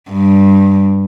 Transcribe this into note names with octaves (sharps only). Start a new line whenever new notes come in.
G2